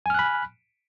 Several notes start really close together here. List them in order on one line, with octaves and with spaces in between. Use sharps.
G#5 F6 F#6 B5